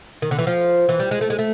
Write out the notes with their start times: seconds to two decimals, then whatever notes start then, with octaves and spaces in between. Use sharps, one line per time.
0.22 D#3
0.31 D3
0.39 E3
0.47 F3
0.89 E3
0.99 G3
1.11 G#3
1.21 A3
1.30 G#3
1.39 A3